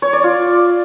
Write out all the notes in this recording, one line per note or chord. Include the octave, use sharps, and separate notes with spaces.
C#5
D5
F4